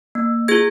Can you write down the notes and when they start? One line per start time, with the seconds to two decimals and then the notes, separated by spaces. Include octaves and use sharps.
0.15 A#3
0.48 F4 G#4 G#6